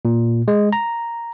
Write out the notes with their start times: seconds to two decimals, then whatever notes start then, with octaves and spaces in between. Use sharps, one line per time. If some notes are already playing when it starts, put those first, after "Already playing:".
0.05 A#2
0.48 G#3
0.73 A#5